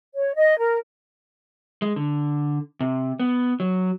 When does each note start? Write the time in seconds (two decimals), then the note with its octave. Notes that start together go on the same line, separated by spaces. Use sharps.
0.15 C#5
0.35 D#5
0.58 A#4
1.82 G#3
1.96 D3
2.81 C3
3.20 B3
3.60 F#3